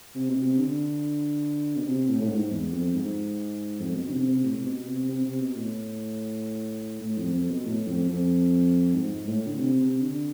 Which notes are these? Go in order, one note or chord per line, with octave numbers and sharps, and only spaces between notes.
C3
B2
C3
D3
B2
C3
A2
A2
G#2
E2
F2
G#2
F2
B2
D3
C3
C3
A2
C3
B2
C3
C3
C3
B2
A2
A2
F2
F2
B2
A2
F2
F2
G#2
A2
D3
C3
C3
D3